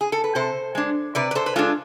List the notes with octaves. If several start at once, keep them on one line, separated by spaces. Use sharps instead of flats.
G#4
A4
B4
C3 A4 C5
G#3 D4
C3 B4 D5
B4
A4 C5
B4
G#3 D4 F4 A4